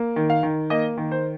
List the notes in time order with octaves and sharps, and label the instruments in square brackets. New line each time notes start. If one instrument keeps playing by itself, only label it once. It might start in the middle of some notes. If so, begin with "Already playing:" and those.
Already playing: [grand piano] A#3
D#3
F5
D#3
A#3 D#5
D#3
C5